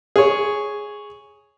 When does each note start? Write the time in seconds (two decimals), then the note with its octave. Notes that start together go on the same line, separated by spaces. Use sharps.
0.16 G#4 C#5